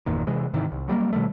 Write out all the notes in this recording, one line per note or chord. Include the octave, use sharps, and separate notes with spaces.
G1 E2 A#2 D#3
C3 E3 G#3
G#2 C3 D#3 E3
C2
F#3 G3 A3 A#3
B2 D#3 G3 A3